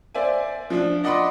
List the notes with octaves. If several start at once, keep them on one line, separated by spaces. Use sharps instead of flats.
C5 D5 E5 G#5
F3 D4
D5 D#5 F#5 B5 C6 D6